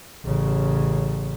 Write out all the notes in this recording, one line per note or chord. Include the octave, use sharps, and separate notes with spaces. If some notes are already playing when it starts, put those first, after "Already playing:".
A1 C#3